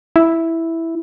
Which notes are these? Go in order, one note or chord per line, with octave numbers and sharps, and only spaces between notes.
E4